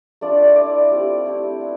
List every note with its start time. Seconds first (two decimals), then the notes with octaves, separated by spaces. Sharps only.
0.21 A3 D4 F4 D5
0.56 A3 E4 D5
0.91 G3 C4 F4
1.25 A3 C4 E4
1.60 B3 E4